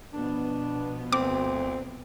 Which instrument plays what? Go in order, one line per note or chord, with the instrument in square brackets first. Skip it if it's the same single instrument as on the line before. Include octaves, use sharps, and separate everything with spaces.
[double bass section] B2 F3 B3 [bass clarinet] D4
[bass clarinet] D2 [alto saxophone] C4 [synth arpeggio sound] D6